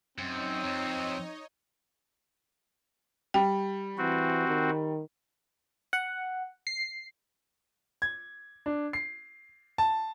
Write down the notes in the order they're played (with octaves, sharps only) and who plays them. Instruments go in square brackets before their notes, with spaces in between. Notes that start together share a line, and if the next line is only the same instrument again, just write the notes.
[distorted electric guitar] F#2 [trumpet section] C4 [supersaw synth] D#4 C#5 D#5
[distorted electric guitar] F2
[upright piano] G3 [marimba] G5
[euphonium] E3 [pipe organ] C4 F#4
[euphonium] D#3
[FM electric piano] F#5
C7
[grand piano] G#6
D4
C7
A5